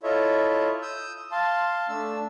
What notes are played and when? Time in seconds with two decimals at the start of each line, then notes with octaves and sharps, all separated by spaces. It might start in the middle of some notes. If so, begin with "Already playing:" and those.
0.03 E4 F4 A4 C#5 D#5 E5
0.82 D#6 E6 G6
1.32 F5 A5 C6
1.89 A3 D4 E6